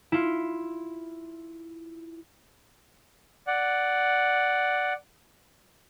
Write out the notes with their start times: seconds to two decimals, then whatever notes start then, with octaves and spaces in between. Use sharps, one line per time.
0.12 E4 F4
3.47 D5 F#5